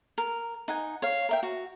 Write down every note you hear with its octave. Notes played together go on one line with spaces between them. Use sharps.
A#4
D#4 F#5 G#5
C#5 F5
A#4 E5 G5
F#4